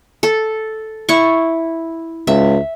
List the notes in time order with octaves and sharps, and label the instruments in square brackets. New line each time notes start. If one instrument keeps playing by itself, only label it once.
[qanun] A4
E4 C#6
[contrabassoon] C#2 [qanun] E5